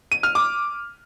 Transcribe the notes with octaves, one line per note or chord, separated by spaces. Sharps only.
D#7
F6
D6